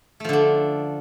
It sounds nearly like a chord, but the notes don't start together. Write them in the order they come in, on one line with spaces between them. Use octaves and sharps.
A3 F3 D3 D4